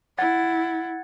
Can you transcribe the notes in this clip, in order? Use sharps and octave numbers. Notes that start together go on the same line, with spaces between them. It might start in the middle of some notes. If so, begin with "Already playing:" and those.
E4 F#5 G#6 A6